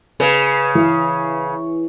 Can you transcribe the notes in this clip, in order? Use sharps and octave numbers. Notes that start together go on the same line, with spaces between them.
C#3 B4
E3